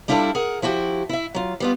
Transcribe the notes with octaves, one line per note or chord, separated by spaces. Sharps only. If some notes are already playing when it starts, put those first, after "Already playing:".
G3 D4 E4 F4 G4 A4
G#4 A#4 F#5
F3 E4 F#4 G4
E4 E5
F#3 F4
G3 B3 F4